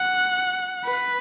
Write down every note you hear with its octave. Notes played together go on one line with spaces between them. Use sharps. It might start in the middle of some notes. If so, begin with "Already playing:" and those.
Already playing: F#5
B4